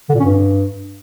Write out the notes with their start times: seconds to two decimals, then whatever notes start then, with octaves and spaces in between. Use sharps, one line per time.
0.10 D3
0.15 A#2
0.20 C#4
0.25 G2